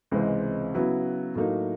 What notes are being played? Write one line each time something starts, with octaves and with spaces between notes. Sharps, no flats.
C#2 C3 E3 G#3 C4
C#3 F#3 B3 E4
A2 F#3 A#3 D#4